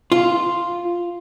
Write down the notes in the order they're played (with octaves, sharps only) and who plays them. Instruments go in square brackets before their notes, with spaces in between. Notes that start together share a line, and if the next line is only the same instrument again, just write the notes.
[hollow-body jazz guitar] F4